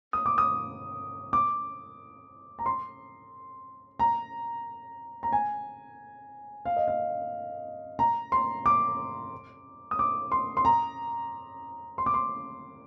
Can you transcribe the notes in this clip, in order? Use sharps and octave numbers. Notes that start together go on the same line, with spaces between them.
D#6
D6
D#6
D6
A#5
C6
A#5
A#5
G#5
F5
D#5
F5
A#5
C6
D6
D#6
D6
C6
C6
A#5
C6
D6
C6